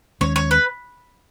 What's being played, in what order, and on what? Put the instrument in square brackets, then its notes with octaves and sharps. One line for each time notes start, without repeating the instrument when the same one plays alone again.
[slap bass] D#2 D#3 G#3 C#4 [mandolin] C#5
[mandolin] C#5
B4